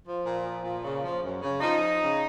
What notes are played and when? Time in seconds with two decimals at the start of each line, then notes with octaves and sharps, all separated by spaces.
0.05 F3
0.25 A#2
0.44 F3
0.64 A#2
0.84 C#3
1.04 F3
1.23 F#2
1.42 C#3
1.61 F3 D#4
1.81 F3
2.00 C#3